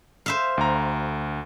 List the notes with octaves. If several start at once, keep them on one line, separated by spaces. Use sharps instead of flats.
C5 E5 F5
D2 A#5